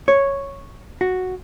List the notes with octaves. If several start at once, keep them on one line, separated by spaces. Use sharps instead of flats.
C#5
F#4